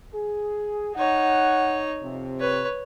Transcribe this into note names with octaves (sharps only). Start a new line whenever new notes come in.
G#4
D#4 C#5 F#5
F2 C3
B4 C#5